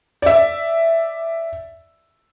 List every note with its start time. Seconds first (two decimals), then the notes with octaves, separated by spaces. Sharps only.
0.22 D5 E5